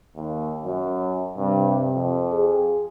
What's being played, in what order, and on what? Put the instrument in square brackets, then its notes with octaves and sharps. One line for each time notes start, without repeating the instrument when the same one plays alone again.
[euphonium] D#2
[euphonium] F#2 [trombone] F#3
[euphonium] G2 [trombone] C3
[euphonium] F2
[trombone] G#4